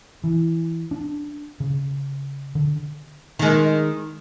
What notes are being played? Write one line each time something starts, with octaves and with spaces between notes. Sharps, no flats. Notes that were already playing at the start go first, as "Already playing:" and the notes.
E3
D4
C#3
D3
D#3 G#3